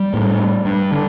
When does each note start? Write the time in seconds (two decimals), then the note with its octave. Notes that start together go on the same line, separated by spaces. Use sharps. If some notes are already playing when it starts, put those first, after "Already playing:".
Already playing: G3
0.14 A2
0.65 G2
0.91 D3